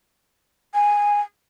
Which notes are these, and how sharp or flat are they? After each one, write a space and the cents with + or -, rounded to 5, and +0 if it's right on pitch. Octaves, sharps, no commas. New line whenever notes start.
G#5 -10